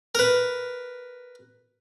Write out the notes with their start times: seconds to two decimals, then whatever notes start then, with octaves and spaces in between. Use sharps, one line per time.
0.15 A#4 B4